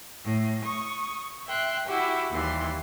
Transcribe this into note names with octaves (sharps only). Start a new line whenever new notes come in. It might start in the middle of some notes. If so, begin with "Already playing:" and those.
A2
C#6 D#6
E5 G5 C6 F#6
E4 F#4 G4
D#2 E3 G3 C6